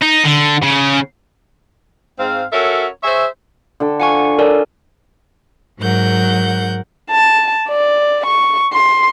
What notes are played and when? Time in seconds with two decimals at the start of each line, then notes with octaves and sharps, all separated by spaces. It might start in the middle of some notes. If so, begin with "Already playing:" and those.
0.02 D#4
0.24 D3
0.63 C#3
2.19 G#2 C4 F5
2.52 C#4 F#4 A4 A#4 C#5 E5
3.03 G#4 C5 C#5 E5
3.80 D3 A4 G5
4.00 F3 F5 F#5 G#5 C#6
4.38 A4 A#4 C#5 D5 G#5
5.80 G#2 F#3 A#4 F#5 G6
7.11 A5
7.69 D5
8.27 C#6
8.73 C6